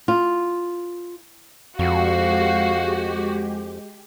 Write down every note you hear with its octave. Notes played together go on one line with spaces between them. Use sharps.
F4
F2 G#3 F#4 G4 F5